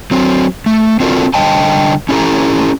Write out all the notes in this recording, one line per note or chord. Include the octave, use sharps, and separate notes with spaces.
F#3 C4
A3
C4 D4 F4 F#4 A4 A#4
D3 G3 D#5 G5 A5
C#4 E4 G4 A4 A#5